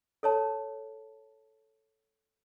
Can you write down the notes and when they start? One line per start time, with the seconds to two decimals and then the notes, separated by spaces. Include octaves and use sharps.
0.23 A4 C#5 A5